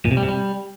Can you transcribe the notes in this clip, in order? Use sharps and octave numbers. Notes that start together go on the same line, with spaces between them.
A#2
C3
G3
C3
G3